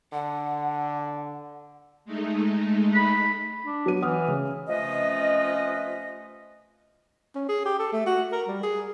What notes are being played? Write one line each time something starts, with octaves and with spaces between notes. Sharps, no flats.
D3 F#5
G#3 A3 D#4
B5
D4
F#3 B3 D#7
E3 F#5 D#6 F6
C#3
C3 F3 A3 C#4 B4 D#5
C#4
G#4
G4
A4
A3
F#4
A#4
G3
G#4